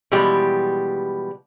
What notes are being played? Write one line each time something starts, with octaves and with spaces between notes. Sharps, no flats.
B2 E3 F3 G3 G#3 G4